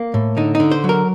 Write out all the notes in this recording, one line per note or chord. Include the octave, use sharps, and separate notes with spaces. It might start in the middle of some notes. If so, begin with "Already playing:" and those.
Already playing: A#3
A2
D3 D#4
D#4
D3
C5
F#3
A#4